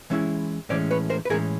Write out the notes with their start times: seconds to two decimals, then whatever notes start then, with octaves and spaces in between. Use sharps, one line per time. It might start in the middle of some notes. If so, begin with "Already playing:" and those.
0.10 E3 G#3 C#4 E4
0.69 A2 E3 G#3 C#4 C5 D5
0.91 B4 C#5
1.10 A#4 C5
1.25 B4
1.30 A2 E3 G#3 C#4 G#4 A#4